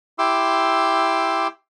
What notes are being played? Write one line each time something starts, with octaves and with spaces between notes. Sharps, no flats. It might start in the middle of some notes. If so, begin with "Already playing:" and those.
E4 G4 C6 D6 E6